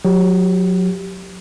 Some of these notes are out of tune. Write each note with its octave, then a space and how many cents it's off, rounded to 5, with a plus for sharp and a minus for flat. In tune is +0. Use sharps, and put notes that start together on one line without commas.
F#3 -25 G4 +0